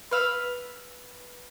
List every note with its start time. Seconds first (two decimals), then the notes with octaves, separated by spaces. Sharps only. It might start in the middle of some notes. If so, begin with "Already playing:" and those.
0.11 B4 F5 E6